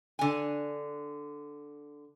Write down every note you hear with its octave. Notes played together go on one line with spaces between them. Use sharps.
D3 G#5